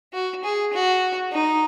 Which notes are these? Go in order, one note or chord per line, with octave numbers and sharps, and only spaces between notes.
F#4
G#4
F#4
D#4